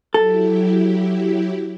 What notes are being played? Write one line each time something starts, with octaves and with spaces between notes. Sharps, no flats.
F#3 E4 G4 A4